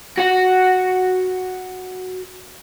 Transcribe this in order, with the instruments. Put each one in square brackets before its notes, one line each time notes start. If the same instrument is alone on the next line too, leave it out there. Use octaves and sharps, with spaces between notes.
[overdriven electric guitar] F#4 F#5